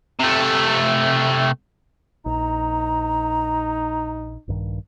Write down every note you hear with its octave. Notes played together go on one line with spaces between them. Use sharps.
C3 A3
A#1 D#4 A#5
A#1 G2 D#3